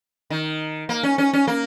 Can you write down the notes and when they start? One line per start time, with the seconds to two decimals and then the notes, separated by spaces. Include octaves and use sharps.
0.30 D#3
0.89 A#3
1.03 C#4
1.18 C#4
1.33 C#4
1.47 A#3